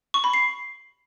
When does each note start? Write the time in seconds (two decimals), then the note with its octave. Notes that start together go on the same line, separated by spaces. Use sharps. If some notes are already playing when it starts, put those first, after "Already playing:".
0.14 C#6
0.24 B5
0.33 C7